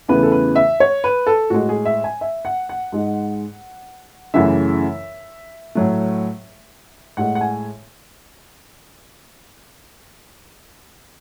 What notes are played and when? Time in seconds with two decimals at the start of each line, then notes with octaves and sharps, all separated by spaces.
0.08 E2 C#3 E3 A3 B4
0.23 A4
0.32 B4
0.56 E5
0.80 C#5
1.04 B4
1.27 A4
1.50 A2 G#3 F#4
1.69 G#4
1.85 E5
2.04 G#5
2.21 E5
2.45 F#5
2.69 F#5
2.92 G#2 G#3
4.34 F#2 C#3 E3 A3 E5
5.75 A2 F#3 A3
7.17 A2 G#3 F#5
7.35 F#5
7.41 G#5